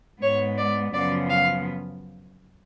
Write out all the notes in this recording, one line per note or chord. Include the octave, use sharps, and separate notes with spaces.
G#2 G#3 B3 C#5
D5
F#2 C#3 F3 B3 D5
F5